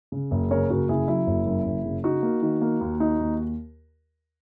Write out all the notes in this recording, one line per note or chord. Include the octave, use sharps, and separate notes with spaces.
C#3
F#1
C#3 A#4 C#5
F#1 F#4 A#4
C#3 E4 G#4
F#3 E4
F#1
F#2
F#1
C#3
D#4 F#4
A#3
D#3
A#3
D#2
D#4
D#2